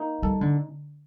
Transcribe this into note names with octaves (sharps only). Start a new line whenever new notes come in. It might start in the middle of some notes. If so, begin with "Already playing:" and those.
Already playing: A#3 D#4
G3 A4
D3